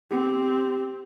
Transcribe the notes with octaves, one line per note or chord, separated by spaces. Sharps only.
C4 G4